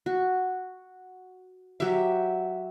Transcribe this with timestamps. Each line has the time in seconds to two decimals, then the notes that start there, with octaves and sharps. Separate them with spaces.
0.06 F#4
1.80 F#3 G4 E5